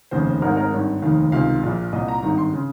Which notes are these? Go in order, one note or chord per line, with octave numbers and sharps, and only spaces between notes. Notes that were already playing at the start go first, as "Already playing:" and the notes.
F1 D#2 C#3 C5
G#1 G#2 D#3 A#4
A#4
G#1 G2 D#3 C#5
F1 D#2 D#3 F5
C#2 C3 D#3 F5
A#1 A#2
C2 A#2 D#5
A#5
G#1 G2 D#3
C6
C#3